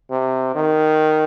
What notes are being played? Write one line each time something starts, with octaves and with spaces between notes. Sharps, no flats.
C3
D#3